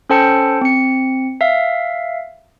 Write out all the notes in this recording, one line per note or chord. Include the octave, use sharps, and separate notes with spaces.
C#4 A4 C5 G5 A5 C#7
C4 C#7
E5 F5